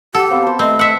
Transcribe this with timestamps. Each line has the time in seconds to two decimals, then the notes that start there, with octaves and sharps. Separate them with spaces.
0.15 G4 A4 F#5
0.30 B3 C4 F5
0.43 C5 A5
0.59 A3 C4 B4 D#5
0.79 E5 F#5